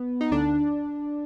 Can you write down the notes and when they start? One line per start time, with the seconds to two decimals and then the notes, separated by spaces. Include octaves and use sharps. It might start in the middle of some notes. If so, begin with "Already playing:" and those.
Already playing: B3
0.21 D#4
0.31 D2 D3 D4